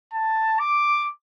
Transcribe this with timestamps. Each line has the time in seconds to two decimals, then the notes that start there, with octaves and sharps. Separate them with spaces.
0.13 A5
0.59 D6